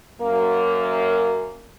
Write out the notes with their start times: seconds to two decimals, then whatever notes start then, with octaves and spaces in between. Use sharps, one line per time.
0.21 F#2 A#3